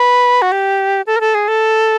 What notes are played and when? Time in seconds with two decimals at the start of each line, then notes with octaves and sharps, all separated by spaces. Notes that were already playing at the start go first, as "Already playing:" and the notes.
Already playing: B4
0.42 F#4
0.52 G4
1.07 A4
1.16 A#4
1.21 A4
1.35 G#4
1.48 A4